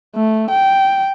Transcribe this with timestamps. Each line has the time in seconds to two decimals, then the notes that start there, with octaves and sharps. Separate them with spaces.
0.16 A3
0.51 G5